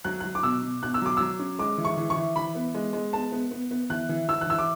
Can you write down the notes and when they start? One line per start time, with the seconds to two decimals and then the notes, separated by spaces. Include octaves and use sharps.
0.04 F#3 F#6
0.20 F#6
0.25 F#3
0.35 D6
0.43 B2 E6
0.63 B2
0.82 B2 F#6
0.94 E6
1.02 F#3 D6
1.17 F#3 E6
1.39 C#4
1.59 G#3 D6
1.78 E3
1.85 C#6
1.97 E3
2.10 C#6
2.16 E3
2.36 E3 B5
2.55 B3
2.74 G#3
2.93 G#3
3.13 B3 A5
3.32 B3
3.51 B3
3.71 B3
3.89 E3 F#6
4.09 E3
4.28 E3 E6
4.41 F#6
4.47 E3 E6
4.58 D6